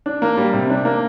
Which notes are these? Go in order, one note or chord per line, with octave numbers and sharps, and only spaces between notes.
D4
A#3
G3
C3
D4
A#3